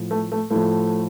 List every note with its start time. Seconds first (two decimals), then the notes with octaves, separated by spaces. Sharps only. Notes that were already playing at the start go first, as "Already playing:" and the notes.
Already playing: A2 F3
0.11 A3
0.32 A3
0.50 A2 F3 A3